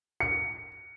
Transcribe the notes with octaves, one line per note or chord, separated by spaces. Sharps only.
C#7